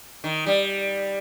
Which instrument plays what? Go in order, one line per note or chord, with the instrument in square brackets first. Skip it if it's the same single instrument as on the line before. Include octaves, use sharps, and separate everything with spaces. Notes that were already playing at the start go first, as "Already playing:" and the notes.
[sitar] D#3
G3